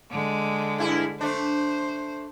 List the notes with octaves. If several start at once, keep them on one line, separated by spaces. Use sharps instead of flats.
D3 G#3
G2 E4 G#4
A3 D4 C5